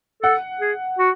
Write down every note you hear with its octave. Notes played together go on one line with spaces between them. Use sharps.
A4 F#5
G#4
F#4